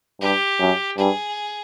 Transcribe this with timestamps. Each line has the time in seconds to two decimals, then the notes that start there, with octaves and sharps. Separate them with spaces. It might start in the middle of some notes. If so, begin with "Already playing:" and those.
0.21 G2 G4
0.59 F#2
0.98 G2 G#4